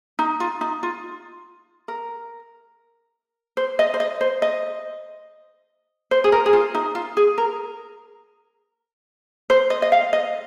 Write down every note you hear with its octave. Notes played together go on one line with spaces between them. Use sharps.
D#4
F4
D#4
F4
A#4
C5
D#5
C5
D#5
C5
D#5
C5
G#4
A#4
G#4
F4
D#4
F4
G#4
A#4
C5
D#5
D#5
F5
D#5